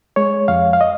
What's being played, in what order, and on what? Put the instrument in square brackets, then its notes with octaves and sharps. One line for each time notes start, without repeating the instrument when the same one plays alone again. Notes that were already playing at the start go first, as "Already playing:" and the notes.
[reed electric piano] G#3 C#5
F2 F5
F5
D#5